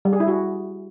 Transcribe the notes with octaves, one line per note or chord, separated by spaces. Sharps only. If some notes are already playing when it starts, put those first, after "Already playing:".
G3
G#4
E4
F#4